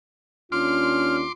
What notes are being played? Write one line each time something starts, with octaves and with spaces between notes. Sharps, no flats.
D#2 C#4 D4 F4 C6 D6 F6